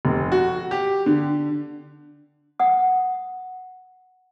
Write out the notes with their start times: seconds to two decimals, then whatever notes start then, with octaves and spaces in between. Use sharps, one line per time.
0.05 F1
0.32 F#4
0.71 G4
1.06 D3
2.59 F#5 D#6